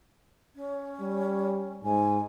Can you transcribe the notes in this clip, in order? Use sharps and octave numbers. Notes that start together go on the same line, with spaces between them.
C#4
G3
G#2 G#5